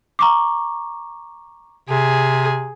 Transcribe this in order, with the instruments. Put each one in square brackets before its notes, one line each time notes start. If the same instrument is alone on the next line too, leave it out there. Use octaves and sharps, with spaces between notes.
[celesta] A#5 C#6 D6
[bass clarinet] C3 [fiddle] G#4